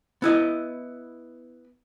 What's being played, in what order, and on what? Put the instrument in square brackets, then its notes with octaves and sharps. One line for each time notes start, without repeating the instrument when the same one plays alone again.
[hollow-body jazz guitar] B3 E4 D#5